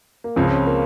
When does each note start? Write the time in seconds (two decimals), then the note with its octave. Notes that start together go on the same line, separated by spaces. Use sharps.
0.24 A#3
0.36 C#2 C#3 F3 C4
0.51 C#4
0.66 A#3